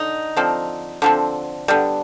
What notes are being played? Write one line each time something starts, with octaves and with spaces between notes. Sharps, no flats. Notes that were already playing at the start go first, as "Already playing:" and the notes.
Already playing: D3 D#4
D3 F3 C4
D3 F3 C4
D3 G3 B3